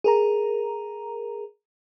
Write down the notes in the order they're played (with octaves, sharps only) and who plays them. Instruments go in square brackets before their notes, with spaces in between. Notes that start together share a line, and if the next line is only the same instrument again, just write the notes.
[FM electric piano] G#4 A#4 A#5